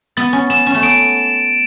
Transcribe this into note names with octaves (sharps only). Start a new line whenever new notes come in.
B3 A6
C#4
B3 E7
C#4
A3
B3 D7